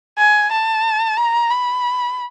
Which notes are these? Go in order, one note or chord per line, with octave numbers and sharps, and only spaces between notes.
G#5
A5
A#5
B5